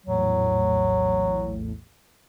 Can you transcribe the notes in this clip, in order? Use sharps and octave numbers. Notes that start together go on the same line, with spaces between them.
A#1 E2 A2 F#3